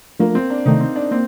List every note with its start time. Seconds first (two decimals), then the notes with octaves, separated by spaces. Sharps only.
0.20 F3 A3 A#3 D4 F4
0.35 C4
0.50 D4
0.66 C3 D#3 A3 D#4
0.80 C4
0.96 D4
1.11 A#3 C4